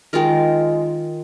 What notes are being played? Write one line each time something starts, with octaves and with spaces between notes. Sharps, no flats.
D#3 G#3 F4 A#4